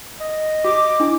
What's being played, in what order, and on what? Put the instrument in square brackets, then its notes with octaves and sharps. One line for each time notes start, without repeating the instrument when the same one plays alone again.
[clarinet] D#5
[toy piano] F#4 [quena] D6
[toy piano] D4 E4